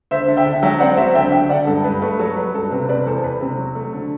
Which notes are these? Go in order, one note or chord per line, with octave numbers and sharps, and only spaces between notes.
D3 C5 E5
D3
E5 G5
D3
F#3 E5 G5
C4 D5 F#5
F#3 C5 E5
D3 E5 G5
D3 E5 G5
D3 D5 F#5
G2 A4
G2 B4
A3 B4
F#3 A4
F#3 B4
G2 A4
C3 B4
C3 B4 D5
E2 A4 C5
E2 B4
C3
F#3
A3
D3